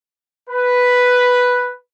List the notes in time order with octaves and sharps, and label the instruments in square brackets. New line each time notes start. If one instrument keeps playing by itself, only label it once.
[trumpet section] B4